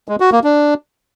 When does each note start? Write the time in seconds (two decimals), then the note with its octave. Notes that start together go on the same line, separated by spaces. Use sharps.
0.09 G#3
0.20 F#4
0.32 A#3
0.44 D4